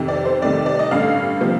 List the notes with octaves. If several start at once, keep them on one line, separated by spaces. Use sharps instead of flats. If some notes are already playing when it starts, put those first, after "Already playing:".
Already playing: F2 C3 D#3
D5
C5
C2 C3 D#3 A3 D5
D5
D#5
A1 G2 D3 A3 F5
C3 F3 A#3